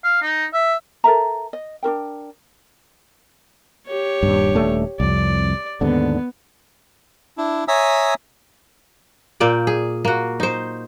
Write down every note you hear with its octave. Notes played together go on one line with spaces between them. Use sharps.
F5
D#4
E5
A4 A#4 E5 A#5
D#5
D4 F#4 A#4 G5
G4 C#5
D#1 G2
D#1 A3 D4
C2 F2 D5
D#2 G#2 D3 B3
D4 E4
C#5 E5 G#5 A#5 D#6 E6
A#2 A#3 D5 G5
G#4
A#3 F#4
D#4 C5